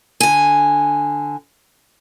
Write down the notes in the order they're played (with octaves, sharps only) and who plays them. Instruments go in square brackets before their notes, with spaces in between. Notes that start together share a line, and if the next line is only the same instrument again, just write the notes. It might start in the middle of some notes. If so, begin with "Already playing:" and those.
[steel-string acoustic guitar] D3 G#5